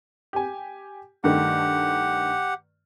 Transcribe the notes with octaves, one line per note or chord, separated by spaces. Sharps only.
G4 G#5
G2 D#3 A3 G4 F#5